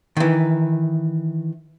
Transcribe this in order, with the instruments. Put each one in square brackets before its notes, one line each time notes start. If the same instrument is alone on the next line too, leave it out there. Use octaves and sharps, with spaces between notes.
[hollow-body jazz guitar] D#3 E3